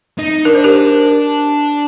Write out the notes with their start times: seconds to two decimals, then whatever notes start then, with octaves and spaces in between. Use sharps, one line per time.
0.19 D#4
0.45 D4 A#4
0.55 C5
0.64 G4 A#4